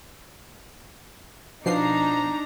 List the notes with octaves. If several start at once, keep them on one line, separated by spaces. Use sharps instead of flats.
B2 F3 D4 D#4 A#5 C7